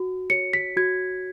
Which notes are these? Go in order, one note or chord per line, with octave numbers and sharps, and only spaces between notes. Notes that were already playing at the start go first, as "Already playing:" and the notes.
Already playing: F#4
C#5 C#7
B6
F#4 G#6